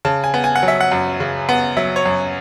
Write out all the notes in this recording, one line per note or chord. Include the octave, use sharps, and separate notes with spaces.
C#3 A5
G#5
B3
G#5
F#5
F#3
E5
F#5
F#2
C#3
B3
F#3 E5
C#5
F#2